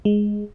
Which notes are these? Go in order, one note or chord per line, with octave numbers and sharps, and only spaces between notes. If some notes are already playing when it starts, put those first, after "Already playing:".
G#3